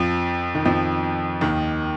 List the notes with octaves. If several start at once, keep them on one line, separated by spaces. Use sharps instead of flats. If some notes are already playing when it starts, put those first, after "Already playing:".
Already playing: F2 F3
D#3
F2 F3
D#2 D#3